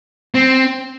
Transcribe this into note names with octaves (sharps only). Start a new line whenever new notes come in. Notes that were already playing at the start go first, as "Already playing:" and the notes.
C4